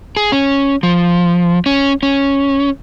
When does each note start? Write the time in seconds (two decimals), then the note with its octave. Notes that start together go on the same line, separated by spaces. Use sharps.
0.17 G#4
0.32 C#4
0.83 F3
1.66 C#4
2.03 C#4